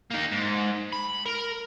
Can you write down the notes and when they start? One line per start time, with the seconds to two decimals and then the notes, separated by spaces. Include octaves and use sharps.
0.11 A#3 D#4
0.32 G#2
0.92 B5
1.26 A#4